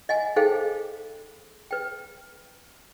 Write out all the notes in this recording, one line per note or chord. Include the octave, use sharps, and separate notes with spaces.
D#5 F#5 G#5
D#4 G#4 A4 C5 F5 G5
B4 G5